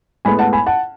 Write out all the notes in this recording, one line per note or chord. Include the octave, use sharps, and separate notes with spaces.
A2 G#3 B3 G#5 B5
F#5 A5
G#5 B5
F#5 A5